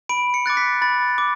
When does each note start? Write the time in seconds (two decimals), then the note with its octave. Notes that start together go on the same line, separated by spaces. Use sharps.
0.09 B5 D7
0.34 C#7
0.46 D6 F#6 A6
0.57 B6
0.82 B5 A6
1.18 D6